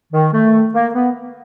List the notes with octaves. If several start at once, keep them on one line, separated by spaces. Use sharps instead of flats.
D#3
A3
A#3
B3